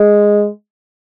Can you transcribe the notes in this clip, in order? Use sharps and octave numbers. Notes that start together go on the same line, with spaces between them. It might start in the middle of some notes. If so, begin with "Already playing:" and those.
Already playing: G#3